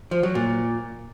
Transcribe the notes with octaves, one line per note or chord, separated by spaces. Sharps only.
F3
F#3
A#2